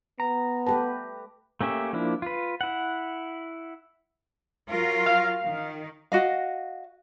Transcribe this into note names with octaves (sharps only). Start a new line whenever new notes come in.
B3 A#5
A3 G4 B4 A5
A3 A#3 C#4 G4 E5
F3 A#3 D4 E4
F4 B4
E4 F#5
F#3 F4 A#4
F5
D#3
F#4 D#5 F5